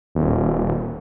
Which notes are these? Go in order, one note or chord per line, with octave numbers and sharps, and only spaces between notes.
D#1